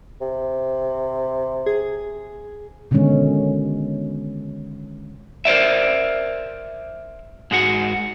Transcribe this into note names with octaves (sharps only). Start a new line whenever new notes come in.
C3
G#4
B2 D3 D#3 G#3 C#4
A#4 C5 D5 E5
G#2 G#3 F#4